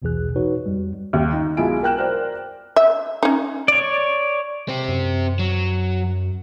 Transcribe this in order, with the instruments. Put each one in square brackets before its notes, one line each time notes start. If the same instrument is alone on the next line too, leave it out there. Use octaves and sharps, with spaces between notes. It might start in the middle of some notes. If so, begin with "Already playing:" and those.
[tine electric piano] B1 E2 B2 E3 G#4 F#6
D#4 F#4 B4 C#5
F2 G3
[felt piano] D#2
D#4
B1 G#3 E4 F4 G#5 D7
A#4 G5 F#6 E7
A#4 C5 D5 G5
[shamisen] E5
C#4 D#4
[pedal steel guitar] C#5 D5
[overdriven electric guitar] C4 G4
[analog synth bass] F#2
[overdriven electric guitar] F#3